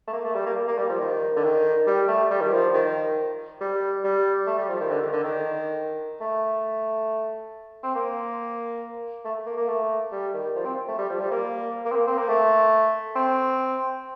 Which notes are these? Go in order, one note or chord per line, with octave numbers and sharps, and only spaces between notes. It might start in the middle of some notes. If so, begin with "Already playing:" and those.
A3
A#3
A3
G3
A#3
A#3
G3
F3
D#3
D3
D#3
G3
A3
G3
D#3
F3
D#3
G3
G3
A3
G3
F3
D#3
D3
D#3
D3
D#3
A3
C4
A#3
A3
A#3
A#3
A3
G3
D#3
F3
C4
A3
G3
F3
G3
A#3
A#3
C4
A#3
C4
A#3
A3
C4